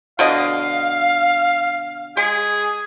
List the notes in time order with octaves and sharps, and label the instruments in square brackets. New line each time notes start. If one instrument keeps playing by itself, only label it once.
[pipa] B2 D3 D#5 [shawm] F5
[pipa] G#3 [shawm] G#4